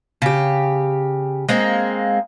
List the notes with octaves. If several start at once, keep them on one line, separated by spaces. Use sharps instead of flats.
C#3 G4
G#3 A#3 C4